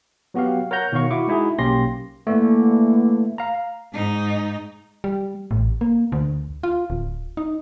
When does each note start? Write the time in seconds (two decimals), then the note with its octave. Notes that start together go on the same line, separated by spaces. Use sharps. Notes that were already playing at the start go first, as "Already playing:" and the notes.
0.34 F#3 B3 F#4 G4 F5
0.71 A#4 C#5 F#5 A#5 G6
0.92 B2 D#3 F#4 C#5 F5 C#6
1.11 E4 F#4 E5 C#6 D6
1.27 G#3 D#4 E4 F#4 G#4
1.58 B1 A#3 C#4 G4 C6 A#6
2.27 D3 E3 A3 A#3
3.38 F5 A#5
3.93 G#2 D#4
5.04 G3
5.51 A1
5.81 A#3
6.12 D2
6.63 F4
6.90 D1
7.37 D#4